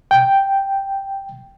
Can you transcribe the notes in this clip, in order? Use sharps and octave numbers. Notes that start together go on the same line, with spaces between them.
G5